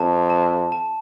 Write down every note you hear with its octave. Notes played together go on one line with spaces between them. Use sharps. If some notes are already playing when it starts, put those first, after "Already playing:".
Already playing: F2 A5
A5
A5